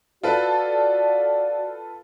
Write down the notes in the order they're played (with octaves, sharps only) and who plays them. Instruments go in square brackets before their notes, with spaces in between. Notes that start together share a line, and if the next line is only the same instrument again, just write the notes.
[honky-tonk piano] F4 A4 B4 [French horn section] F#4 D5